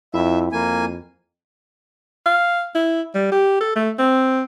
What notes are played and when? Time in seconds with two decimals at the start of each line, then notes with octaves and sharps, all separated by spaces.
0.14 F2 E4 E5 B5
0.52 F2 A#3 G#5
2.26 F5
2.75 E4
3.15 G3
3.32 G4
3.60 A4
3.76 A3
3.99 C4